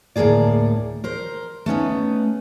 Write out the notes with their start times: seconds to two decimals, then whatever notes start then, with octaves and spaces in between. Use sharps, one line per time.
0.16 D2 A2 D#3 A#3 G#4 D5
1.04 A#4 C5
1.66 A3 B3 C#4 D#4